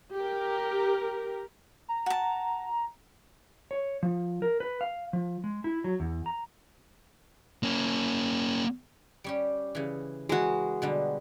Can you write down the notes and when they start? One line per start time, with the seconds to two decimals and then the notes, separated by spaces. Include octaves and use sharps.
0.15 G4 A#4
1.89 A#5
2.06 F#4 A5
3.71 C#5
4.03 F3
4.42 A#4
4.60 B4
4.81 F5
5.13 F3
5.44 G#3
5.64 E4
5.84 F#3
6.00 E2
6.26 A#5
7.63 A#3 C#4
9.24 G3 C#4 G4
9.75 C#3 E3
10.29 E3 G#3 F#4 A#4
10.82 B2 D3 G3